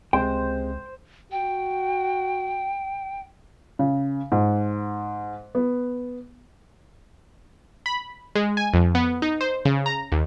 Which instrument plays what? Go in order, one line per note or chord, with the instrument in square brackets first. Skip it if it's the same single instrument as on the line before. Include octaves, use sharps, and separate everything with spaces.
[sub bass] C#2 [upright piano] C3 G#3 [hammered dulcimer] C5 [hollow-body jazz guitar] G5
[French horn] F#4 [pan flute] G5
[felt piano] C#3
G#2
B3
[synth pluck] B5
G#3
G#5
F2
B3
D#4
C5
C#3
A#5
D#2